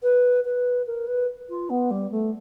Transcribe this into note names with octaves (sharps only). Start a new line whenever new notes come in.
B4
B4
A#4
B4
F4
B3
G3
A3